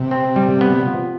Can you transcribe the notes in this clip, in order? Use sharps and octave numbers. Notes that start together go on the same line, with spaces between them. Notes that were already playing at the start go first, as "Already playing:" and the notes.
Already playing: C3
C4
G3
B3
F3